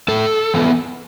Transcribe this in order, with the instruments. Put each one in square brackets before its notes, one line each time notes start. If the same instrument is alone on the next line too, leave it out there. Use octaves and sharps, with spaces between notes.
[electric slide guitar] A2 A4
E3 B3